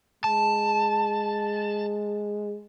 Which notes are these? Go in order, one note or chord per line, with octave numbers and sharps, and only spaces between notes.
G#3 A5